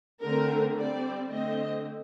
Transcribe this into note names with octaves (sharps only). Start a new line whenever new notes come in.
D3 A3 C4 A#4
G3 C4 D5
D3 A3 C4 D#5